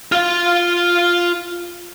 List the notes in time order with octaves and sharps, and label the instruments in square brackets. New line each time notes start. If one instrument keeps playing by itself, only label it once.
[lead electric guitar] F4 F5